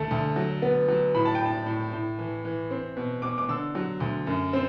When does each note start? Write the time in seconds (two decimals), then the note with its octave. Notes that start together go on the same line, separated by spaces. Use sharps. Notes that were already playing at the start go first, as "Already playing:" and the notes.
Already playing: D2 A3
0.11 D2
0.36 F#3
0.62 B3
0.88 F#3
1.14 A2 B5
1.25 A5
1.35 A2 G5
1.46 A5
1.66 A2
1.93 A2
2.19 E3
2.45 E3
2.71 C4
2.97 B2
3.22 B2 D6
3.38 D6
3.49 D3 E6
3.75 F#3
4.00 D2
4.27 F#2
4.53 C4